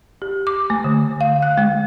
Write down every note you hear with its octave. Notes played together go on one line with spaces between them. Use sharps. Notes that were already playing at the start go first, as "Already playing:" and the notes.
G4
D6
A3
D3
F5
F#6
G#3